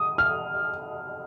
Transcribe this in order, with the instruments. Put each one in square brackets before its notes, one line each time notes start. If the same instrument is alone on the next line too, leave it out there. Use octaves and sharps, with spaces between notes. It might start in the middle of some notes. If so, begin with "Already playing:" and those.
Already playing: [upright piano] D#6
F6